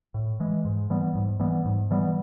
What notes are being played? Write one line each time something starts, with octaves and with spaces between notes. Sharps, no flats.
A2
E3 G#3
G#2
E3 G3 B3
G#2
E3 G3 B3
G#2
E3 G3 B3